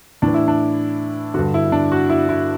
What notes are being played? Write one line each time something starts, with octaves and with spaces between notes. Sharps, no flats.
A2 E3 D4
E4
D4
G2 D3 F#4
E4
D4
F#4
E4
E4